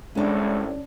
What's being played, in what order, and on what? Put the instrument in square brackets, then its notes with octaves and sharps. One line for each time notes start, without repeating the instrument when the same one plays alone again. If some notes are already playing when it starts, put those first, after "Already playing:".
[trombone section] C2 A2 [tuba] G#3 [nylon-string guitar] C#4 D4